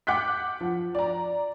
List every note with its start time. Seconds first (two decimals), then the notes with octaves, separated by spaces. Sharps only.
0.07 F#5 D6 F#6 G6 B6
0.61 F3
0.95 D5 A#5